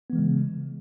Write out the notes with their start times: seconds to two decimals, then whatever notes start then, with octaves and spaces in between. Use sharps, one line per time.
0.10 B3
0.13 E3
0.16 G#3
0.19 C#3